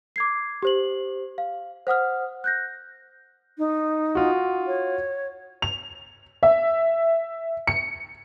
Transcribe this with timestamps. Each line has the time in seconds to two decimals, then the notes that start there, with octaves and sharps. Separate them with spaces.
0.16 D6 G#6 C7
0.63 G4 C5 F#7
1.38 F5
1.87 C5 F#5 D#6 F6
2.44 F#6 G6 A#6
3.58 D#4
4.15 F4 F#4
4.67 C#5
5.62 F7
6.43 E5
7.67 C#7